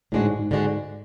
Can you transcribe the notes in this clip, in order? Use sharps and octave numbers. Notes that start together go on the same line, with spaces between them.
A2 D3 G#3 D4 F#4
G#2
G#2
D3 G#3 D4 F#4